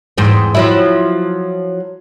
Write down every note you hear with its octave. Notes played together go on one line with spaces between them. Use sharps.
E2 G#2 C4
F3 F#3 E4